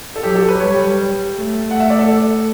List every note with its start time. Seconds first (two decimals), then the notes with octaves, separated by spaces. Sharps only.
0.16 A4
0.23 F#3 G4
0.36 A4
0.48 B4
0.60 G3 C#5
1.35 A3
1.71 F#5
1.80 E5
1.90 D5
1.99 A4